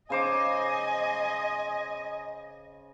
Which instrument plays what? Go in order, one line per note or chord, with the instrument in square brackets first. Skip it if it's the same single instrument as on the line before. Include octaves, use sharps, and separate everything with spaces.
[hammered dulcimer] C#3 C5 D6 [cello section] D#5 [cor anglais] G#5